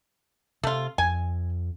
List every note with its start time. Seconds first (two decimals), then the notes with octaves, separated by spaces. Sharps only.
0.63 C3 A3 F4
0.98 F2 G#5